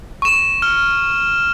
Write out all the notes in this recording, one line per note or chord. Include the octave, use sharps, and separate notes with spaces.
C#6 E7
F6